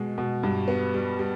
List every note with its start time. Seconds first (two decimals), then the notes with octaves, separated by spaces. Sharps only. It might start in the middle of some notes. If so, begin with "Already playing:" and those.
Already playing: B2 G#3
0.18 B2
0.43 G2
0.68 B3
0.94 G3
1.19 G3